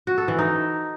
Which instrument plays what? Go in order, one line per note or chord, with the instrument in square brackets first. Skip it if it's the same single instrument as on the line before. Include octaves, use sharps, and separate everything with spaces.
[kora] F#4
A4
E3
D#4